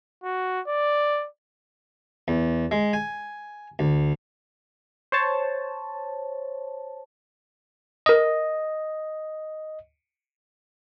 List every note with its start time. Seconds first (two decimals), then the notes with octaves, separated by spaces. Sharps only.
0.24 F#4
0.67 D5
2.28 E2
2.71 G#3
2.93 G#5
3.79 D2
5.12 C5 C#5 A5
8.06 A#4 D#5 D#6